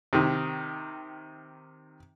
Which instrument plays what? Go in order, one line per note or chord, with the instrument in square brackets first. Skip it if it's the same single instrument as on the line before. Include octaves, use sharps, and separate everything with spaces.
[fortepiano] C3 D#3